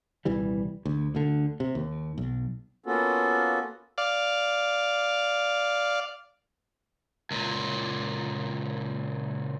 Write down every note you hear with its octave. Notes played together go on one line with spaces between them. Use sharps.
D#1 C2 E3 G3
D2
D2 D3
C3
D#2
B1
A#3 B3 C#4 F4 F#4 A4
D5 F5
C#2 A#2